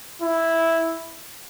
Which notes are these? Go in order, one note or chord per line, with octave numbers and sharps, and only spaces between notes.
E4